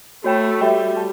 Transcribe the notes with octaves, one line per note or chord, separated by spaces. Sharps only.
A3 F#4 C#5 G5 B5
G3 F#4 A4 E5 G5 B5
A5